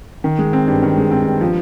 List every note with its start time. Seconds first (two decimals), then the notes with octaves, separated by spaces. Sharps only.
0.24 D#3
0.39 G#3
0.53 C4
0.68 G2
0.82 D#3
0.97 G#3
1.11 C4
1.26 G2
1.41 F3